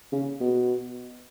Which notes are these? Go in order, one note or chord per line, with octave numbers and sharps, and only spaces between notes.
C#3
B2